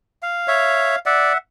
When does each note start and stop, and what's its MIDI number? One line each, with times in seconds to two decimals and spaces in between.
0.23 0.99 77
0.48 0.96 73
0.48 0.96 76
1.06 1.33 74
1.06 1.38 76
1.06 1.38 78